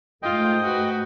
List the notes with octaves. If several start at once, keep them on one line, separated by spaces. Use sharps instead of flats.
G#2 A3 F4 D#5 G5
F#4 B4